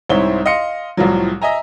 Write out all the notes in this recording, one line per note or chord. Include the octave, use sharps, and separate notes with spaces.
C2 G#2 C4 E4 C#5 G7
D#5 F5 C6 C#7
C2 A2 F3 F#3
D#5 E5 G#5 A#5